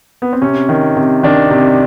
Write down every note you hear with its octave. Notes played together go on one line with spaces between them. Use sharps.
B3
C4
C3 C#4
D#3
C3
D#3 D4
C3